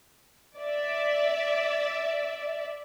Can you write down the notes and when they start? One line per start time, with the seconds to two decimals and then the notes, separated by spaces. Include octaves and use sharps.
0.58 D5 E5